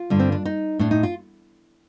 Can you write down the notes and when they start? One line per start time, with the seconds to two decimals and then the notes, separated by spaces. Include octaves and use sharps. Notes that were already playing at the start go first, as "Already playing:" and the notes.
Already playing: F4
0.10 G2 D3
0.19 C4
0.32 D4
0.45 D#4
0.79 A2 D4
0.91 D#4
1.03 F4